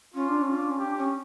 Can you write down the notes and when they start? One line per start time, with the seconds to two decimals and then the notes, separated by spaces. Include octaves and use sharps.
0.14 C#4 F4
0.28 D4
0.42 C#4 F4
0.55 D4
0.70 C#4
0.79 G4
0.84 D4
0.98 C#4